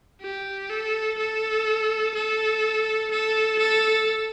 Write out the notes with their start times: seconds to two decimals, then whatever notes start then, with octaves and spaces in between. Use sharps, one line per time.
0.22 G4
0.70 A4
1.18 A4
2.15 A4
3.11 A4
3.59 A4